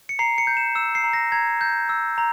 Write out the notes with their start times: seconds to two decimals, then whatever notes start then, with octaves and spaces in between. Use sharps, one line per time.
0.09 C#7
0.19 A#5 C7
0.38 C#7
0.47 G6
0.57 E7
0.75 E6 E7
0.95 C7
1.04 A#5
1.13 A#6
1.32 A#5 G#6
1.61 G6
1.89 E6
2.18 A#5